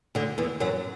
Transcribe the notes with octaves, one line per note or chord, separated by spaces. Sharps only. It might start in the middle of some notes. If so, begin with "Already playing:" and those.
D2 D3
E2 E3
F#2 F#3